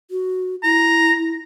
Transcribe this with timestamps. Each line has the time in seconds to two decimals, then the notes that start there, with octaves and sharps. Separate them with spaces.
0.11 F#4
0.63 E4 A#5